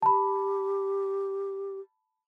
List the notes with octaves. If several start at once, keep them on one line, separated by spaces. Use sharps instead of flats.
G4 A5 B5